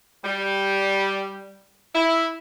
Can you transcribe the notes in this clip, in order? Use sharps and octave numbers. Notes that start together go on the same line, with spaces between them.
G3
E4